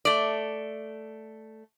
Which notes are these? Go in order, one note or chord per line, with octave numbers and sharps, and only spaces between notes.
A3 D5